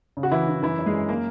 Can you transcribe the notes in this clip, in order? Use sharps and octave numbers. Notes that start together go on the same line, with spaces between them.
C#3
F#4
E3 E4
E3
F#2 E3 E4
F#2
G#3 G#4
F#2
A#3 A#4